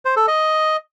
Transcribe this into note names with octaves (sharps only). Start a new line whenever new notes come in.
C5
A4
D#5